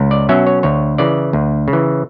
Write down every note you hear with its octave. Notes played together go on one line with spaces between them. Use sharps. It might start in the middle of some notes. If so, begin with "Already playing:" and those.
Already playing: C#2
D5
B2 F#3 C#4 E5
C#5
D2 C#5
C#3 E3 D5
D2
C#3
E3